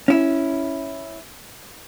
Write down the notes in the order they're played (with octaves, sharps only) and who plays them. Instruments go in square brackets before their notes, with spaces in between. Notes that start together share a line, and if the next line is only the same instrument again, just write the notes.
[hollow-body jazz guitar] C#4 E4